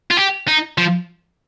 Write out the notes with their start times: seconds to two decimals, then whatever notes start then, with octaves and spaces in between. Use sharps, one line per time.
0.11 F4
0.17 G4
0.48 D#4
0.78 F3